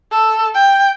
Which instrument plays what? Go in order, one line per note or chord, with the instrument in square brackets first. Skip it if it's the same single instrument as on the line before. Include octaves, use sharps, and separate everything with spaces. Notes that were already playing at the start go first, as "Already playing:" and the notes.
[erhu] A4
G5